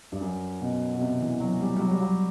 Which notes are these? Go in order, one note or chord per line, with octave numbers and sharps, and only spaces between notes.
G2
F#2
B2
B2
C3
E3
F#3
G3
G3
F#3
G3
F#3